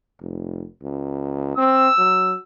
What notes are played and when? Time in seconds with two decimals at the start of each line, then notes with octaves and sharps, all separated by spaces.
0.21 F1
0.83 C#2
1.57 C4 E6
1.98 F#3